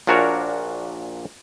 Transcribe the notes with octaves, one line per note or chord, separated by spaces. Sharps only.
A#1 A#2 D4 F#4 A#4 C#5